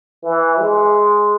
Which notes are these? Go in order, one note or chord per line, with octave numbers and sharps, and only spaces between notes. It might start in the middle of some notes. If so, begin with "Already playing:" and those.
E3
G#3